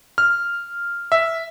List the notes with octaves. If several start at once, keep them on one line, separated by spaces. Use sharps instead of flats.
F6
E5